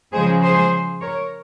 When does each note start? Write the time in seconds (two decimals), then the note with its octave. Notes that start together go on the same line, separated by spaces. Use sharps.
0.13 C#3 F3 G#3 G#4 C5
0.43 G#4 C5
1.01 A#4 C#5